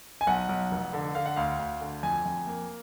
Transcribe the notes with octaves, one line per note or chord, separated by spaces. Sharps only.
G#5
B1 F#5
B1
F1
D3
D3 F5
F#5
D2 F5
D2
D3
F2 G#5
F2
A#3